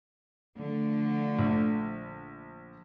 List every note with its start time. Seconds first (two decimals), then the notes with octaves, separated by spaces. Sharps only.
0.57 D3 F3 A3
1.39 A#1